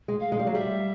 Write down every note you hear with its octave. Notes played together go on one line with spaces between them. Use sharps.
G#3
F5
G#3
G3
F#3
G3 E5